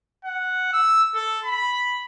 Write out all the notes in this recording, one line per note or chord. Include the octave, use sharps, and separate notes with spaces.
F#5
E6
A4
B5